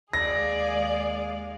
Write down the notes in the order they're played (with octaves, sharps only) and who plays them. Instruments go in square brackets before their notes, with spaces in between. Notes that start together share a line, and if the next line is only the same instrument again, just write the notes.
[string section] D#2 G#3 F5 [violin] G#4 D5 [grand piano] A#6